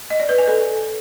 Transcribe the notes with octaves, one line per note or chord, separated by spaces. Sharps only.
D#5
D5
B4
G#5
A4